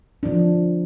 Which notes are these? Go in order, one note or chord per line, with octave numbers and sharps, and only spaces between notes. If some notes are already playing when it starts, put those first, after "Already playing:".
F3 D4